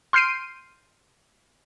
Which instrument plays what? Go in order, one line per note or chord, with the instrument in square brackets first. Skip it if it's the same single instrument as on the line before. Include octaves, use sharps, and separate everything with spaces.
[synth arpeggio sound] C6 F6 G6 C7 D7 D#7